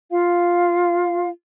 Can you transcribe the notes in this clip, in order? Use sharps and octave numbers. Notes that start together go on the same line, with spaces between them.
F4 F5